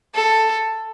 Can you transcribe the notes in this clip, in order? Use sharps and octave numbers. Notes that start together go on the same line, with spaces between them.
A4